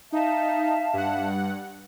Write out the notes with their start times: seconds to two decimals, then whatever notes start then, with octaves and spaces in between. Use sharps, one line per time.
0.12 D#4 E5 F5 A5
0.93 G2 F#5